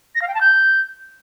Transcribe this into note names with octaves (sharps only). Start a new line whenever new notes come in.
A#6
F5
G5
A5
G6